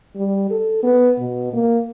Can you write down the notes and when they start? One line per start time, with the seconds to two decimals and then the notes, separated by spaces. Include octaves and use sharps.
0.16 G3
0.50 A4
0.83 B3
1.19 B2
1.53 A#3